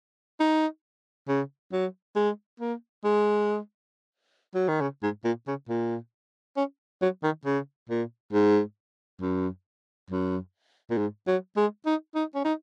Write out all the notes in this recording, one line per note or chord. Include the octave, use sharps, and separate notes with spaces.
D#4
C#3
F#3
G#3
A#3
G#3
F#3
D#3
C#3
G#2
A#2
C#3
A#2
C#4
F#3
D#3
C#3
A#2
G#2
F#2
F#2
A#2
G#2
F#3
G#3
D#4
D#4
C#4
D#4